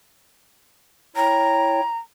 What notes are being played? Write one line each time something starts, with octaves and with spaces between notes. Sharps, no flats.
E4 C#5 G5 A#5